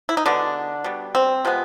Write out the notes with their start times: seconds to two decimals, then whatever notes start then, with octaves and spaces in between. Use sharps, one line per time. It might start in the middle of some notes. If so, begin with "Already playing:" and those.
0.09 E4
0.17 D#4
0.25 B2 D3 G#3 B3 D4
0.84 B2 G3 B3
1.15 C4
1.45 C3 F3 G#3 B3